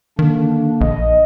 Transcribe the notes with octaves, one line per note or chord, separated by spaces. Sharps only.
D3 D#3 A#3 D4
A#1 D#5